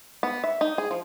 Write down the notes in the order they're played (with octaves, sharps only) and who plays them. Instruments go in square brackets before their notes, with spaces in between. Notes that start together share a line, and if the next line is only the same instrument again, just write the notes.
[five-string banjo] B3
E5
D#4
G#4
F3